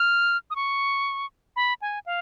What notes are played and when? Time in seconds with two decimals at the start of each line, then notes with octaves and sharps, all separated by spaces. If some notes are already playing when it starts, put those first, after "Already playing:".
Already playing: F6
0.50 D#6
0.56 C#6
1.56 B5
1.82 G#5
2.06 F5